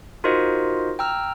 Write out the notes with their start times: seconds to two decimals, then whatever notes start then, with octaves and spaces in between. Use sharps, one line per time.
0.24 D#4 F4 F#4 A#4 C5 D#5
0.99 G5 A#5 E6 F6